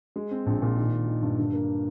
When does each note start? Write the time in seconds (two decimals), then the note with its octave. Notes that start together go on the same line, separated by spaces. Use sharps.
0.16 G#3
0.31 C4
0.46 A#1
0.62 A#2
0.77 D#3
0.92 D#3
1.08 D#3
1.22 G2
1.38 D3
1.53 A#3